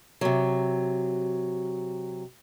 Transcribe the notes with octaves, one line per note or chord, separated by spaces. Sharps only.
C3 F#3